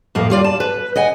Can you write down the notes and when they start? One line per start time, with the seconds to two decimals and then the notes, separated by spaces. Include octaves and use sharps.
0.15 F2 A2 A#3
0.30 G3 F4 D5
0.44 A5
0.60 B4
0.96 D#5 F#5 G#5